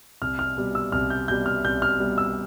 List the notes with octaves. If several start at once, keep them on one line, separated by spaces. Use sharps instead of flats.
C2 F6
F6
B2 G3
E6
C2 F6
G6
B2 G3 G6
F6
C2 G6
F6
B2 G3
E6